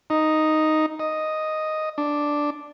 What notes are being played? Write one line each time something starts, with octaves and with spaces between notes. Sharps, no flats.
D#4
D#5
D4